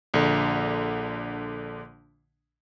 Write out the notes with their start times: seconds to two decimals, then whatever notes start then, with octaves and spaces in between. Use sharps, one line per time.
0.14 A#1 D3